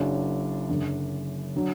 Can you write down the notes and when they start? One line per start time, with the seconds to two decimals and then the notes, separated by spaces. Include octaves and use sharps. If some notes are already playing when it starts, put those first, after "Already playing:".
Already playing: F#1 F#2 F#3 D4
0.69 F#1 F#2 D3
1.56 D3 F#3